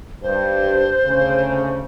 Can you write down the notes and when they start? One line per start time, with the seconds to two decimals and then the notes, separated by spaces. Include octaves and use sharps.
0.23 G2 C5
1.05 D2 C#3